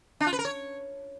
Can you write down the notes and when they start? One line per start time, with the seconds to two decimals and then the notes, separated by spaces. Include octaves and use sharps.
0.20 D4
0.27 F4
0.33 B4
0.39 A#4
0.45 C#5